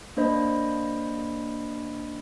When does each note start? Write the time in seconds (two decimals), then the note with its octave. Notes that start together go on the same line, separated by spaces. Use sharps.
0.17 A#3 D4 C5 D#5 B5